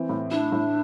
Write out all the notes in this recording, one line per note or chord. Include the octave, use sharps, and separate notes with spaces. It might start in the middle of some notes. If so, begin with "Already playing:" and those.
Already playing: E3 C4
A2
D4 E4
A2